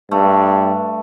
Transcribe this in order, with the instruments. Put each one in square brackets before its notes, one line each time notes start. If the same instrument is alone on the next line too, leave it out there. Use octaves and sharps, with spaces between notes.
[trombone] G2 [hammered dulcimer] A3